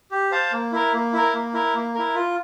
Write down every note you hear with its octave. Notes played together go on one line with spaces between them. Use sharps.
G4
C5 F5 A5
A#3
E4 A#4
A#3
E4 A#4
A#3
E4 A#4
A#3
E4 A#4
F4